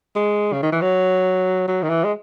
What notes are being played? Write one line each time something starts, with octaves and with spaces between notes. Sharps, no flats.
G#3
C#3
D#3
E3
F#3
F#3
D#3
E3
G#3